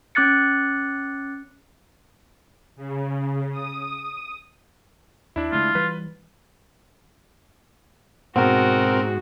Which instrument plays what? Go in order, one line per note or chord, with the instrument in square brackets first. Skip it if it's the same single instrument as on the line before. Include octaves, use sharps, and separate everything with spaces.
[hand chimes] C#4 D6 F#6 A6 C#7
[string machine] C#3
D#6
[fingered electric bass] D#2 [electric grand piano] D4 E4
[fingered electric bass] C#3 G#3 A3 [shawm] F4
[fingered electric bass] E3 G3 [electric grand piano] B4
[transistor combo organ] G#2 [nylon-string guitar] B2 [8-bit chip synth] C4 A#4 [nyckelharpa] F#4